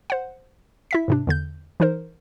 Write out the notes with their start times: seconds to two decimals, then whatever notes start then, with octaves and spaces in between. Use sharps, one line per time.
0.10 C5 F#5
0.91 E4 E5 B6
1.08 G#2 C3 D4
1.27 E2 D3 G6
1.80 E3 D#4 A#4 C5